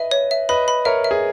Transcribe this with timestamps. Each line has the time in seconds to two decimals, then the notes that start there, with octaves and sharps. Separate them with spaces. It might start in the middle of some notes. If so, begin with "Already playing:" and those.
Already playing: B4 D#5 E5
0.11 C#5
0.31 E5
0.49 B4 D#5 B5
0.68 B5
0.85 A#4 C#5 E5
1.04 E5
1.11 G#4